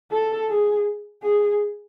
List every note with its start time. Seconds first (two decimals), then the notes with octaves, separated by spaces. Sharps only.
0.11 A4
0.49 G#4
1.23 G#4